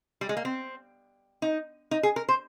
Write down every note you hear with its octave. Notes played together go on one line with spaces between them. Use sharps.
G3
G#3
A#3
C4
D#4
D#4
G#4
A#4
C5